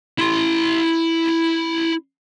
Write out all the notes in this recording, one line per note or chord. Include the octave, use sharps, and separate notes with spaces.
E4 C6